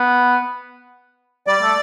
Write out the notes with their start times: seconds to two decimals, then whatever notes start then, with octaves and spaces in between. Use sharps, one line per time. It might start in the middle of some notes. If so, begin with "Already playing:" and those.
Already playing: B3
1.47 G3 D5
1.62 A3